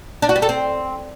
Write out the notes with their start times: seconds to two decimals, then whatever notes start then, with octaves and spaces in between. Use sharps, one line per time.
0.22 D4
0.29 F#4
0.36 G3
0.42 A4
0.49 C4